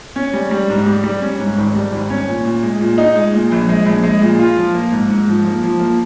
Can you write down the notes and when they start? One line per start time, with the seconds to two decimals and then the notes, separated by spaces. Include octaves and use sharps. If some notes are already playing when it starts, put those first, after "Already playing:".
0.16 C#4
0.33 G3
0.51 G3
0.70 G#2
0.86 G3
1.04 G3
1.22 C#4
1.39 G#2
1.58 G#1
1.75 G3
1.92 G#1
2.10 C#4
2.28 A#2
2.45 A#2
2.63 G#3
2.81 A#2
2.98 D#4
3.16 G#3
3.34 A#2
3.51 A#1
3.69 G#3
3.86 A#1
4.03 G#3
4.22 A#2
4.39 F4
4.57 F3
4.74 A#3
4.92 G#2
5.10 G#2
5.28 F3
5.45 A#3
5.63 F3
5.80 A#3